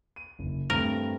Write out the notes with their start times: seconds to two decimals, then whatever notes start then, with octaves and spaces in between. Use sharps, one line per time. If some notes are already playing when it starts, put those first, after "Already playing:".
0.16 D#7
0.39 F#1
0.70 G2 A3 C4 A#4